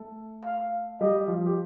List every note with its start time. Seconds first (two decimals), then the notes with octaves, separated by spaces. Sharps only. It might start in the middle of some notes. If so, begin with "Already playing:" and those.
Already playing: A3 A4
0.45 F5
1.01 G3 G4 D#5
1.28 F3 F4
1.46 G4